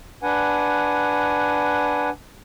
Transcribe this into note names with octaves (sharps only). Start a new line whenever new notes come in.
D4 B4 F#5 G#5